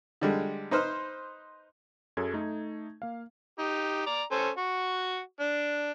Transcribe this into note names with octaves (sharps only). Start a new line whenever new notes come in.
D3 G3 G#3
D#4 B4 C5 F6
F#2 F#3 G#4 A4 G#6
A3 D#4
A#3 F5
D#4 G4
D5 A#5
C#4 A4 C5
F#4 C#6
D4